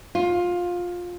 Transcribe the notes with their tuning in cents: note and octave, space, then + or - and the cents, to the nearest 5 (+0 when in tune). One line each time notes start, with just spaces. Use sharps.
F4 +15